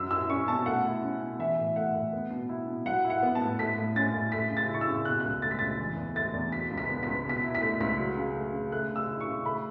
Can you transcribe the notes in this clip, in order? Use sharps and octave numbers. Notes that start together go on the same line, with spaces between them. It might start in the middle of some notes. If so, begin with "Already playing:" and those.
Already playing: F#2 F#3 E6
E4 E6
C#4 C#6
B2 A5
A3 F#5
E4
C#4
B2
E3 E5
A2
A3 F#5
A2
B3
B2
E4
B2
F#3 F#5
E4
F#5
B3
A5
A2
A3 B6
A2
C#4 A6
A2
A3 B6
C#3
A6
E4 C#6
E6
C#3
B2 F#6
E6
C#2 F#6
A3 A6
B6
C#2 A6
E3
E2
A3 A6
E2
B2 B6
C#2
B6
B3
C#2 B6
B2 B6
E4
B6
A3
C#2 B6
F#3
C#3
A3
C#3
A3 F#6
C#3
E6
E4
C#6
C#3
A3 B5